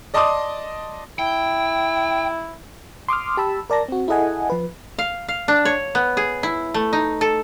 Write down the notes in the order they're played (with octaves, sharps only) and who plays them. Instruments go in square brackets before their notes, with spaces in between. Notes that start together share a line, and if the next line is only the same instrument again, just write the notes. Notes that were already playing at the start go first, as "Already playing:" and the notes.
[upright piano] D5 D#5 A5 C6 D6 D#6
[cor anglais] E4 [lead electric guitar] G5
[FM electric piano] C6 D6 D#6 F6
G4 A5 B5 E6
A#4 D5 A5 A#6
C4 F#4
E4 G#4 A4 D#5 F#5 G#5
F3 B4
[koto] F5
F5
D4
C#5
B3
G#4
E4
A3
D#4
A4